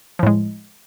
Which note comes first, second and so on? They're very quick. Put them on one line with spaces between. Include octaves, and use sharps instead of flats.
F3 A2 G#3